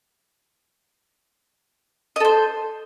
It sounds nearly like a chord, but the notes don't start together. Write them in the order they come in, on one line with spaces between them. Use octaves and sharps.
D#5 A4 C5